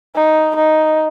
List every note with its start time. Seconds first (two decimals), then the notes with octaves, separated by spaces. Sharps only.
0.15 D#4
0.56 D#4